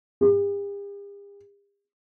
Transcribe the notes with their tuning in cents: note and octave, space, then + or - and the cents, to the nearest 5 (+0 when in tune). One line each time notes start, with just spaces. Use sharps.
G4 +45